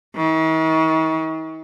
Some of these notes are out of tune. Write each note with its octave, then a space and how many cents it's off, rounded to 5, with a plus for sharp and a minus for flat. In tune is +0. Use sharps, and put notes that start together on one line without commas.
D#3 +45